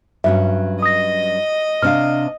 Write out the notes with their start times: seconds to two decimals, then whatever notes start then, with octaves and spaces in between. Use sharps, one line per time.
0.24 G2 F#3 C#4 E5
0.82 D#5 D#6 A#6
1.82 C3 D4 F5 F6